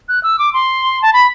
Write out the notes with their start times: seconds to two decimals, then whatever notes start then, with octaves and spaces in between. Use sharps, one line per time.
0.09 F#6
0.23 E6
0.39 D6
0.54 C6
1.02 A5
1.13 B5